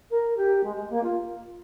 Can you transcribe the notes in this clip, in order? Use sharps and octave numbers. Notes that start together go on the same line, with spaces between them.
A#4
G4
G#3
G#3
A#3
F4